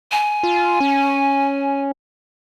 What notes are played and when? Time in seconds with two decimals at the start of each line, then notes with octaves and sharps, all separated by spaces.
0.11 G#5
0.43 F4
0.80 C#4